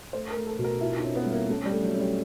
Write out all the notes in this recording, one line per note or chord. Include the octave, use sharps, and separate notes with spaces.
A3 C5
A#4
A3
A4
B2
A#4
E4 F4
D#4
C#4
B3
G3
A#3
A3 C#4
G3
A3
F#3
C#4
G3